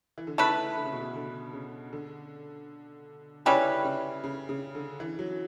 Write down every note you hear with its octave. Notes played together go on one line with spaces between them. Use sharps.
E3
D3
C#3 A3 E4 B4
D3
C#3
B2
C#3
D3
C#3
D3
C#3 G3 C#4 E4 B4
C#3
C#3
C#3
D3
E3
F#3